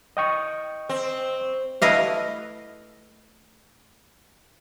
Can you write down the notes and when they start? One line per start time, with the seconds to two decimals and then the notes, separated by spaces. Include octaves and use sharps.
0.17 D#5 G5 C#6
0.89 C4
1.82 A3 E4 B4 D#5 F5